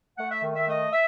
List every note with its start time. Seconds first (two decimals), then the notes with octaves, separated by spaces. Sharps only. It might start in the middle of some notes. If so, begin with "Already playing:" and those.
0.18 A3 F#5
0.31 E5
0.43 D#3
0.55 E5
0.67 A3 D#5
0.92 E5